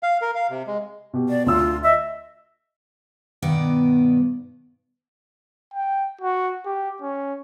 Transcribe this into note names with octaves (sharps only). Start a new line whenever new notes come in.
F5
A#4
F5
C3
G#3
B2 G4
D5
D2 F4 E6
D#5 E5
G2 B2 D#3 B3 D5
G5
F#4
G4
C#4